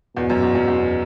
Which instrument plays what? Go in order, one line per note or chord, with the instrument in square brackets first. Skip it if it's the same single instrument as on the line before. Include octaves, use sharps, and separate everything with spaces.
[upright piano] E2 [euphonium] B2
[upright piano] F#2
E2
F#2
E2